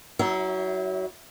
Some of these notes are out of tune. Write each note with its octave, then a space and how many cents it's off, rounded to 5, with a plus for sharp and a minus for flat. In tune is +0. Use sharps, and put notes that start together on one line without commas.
F#3 +20 E4 -30 E5 +0